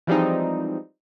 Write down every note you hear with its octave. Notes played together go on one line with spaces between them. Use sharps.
E3 F3 G3 G#3 C4 D#4